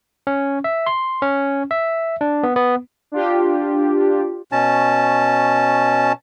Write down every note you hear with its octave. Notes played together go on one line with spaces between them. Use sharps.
C#4
E5
C6
C#4
E5
D4
B3
B3
D4 F4 G4
B2 C#4 A5